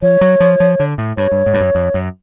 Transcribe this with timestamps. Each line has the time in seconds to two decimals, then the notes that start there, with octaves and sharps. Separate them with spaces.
0.02 F3 C#5
0.21 F#3
0.40 F3
0.60 F3
0.80 D3
0.98 A2
1.17 G2 C#5
1.32 G2
1.46 G#2
1.54 G2
1.60 F#2
1.75 F2
1.94 F#2